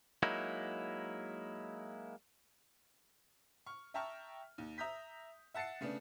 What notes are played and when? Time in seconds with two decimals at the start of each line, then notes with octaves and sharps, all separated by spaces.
0.23 F#3 G#3 A#3 D#4 E4
3.66 C#6 F6
3.94 E5 G5 A5 A#5 C#6 F6
4.58 D#2
4.78 E5 A#5 D#6 G6 B6
5.54 E5 F#5 A5 A6 C7 C#7
5.81 C#3 A3 B3 D4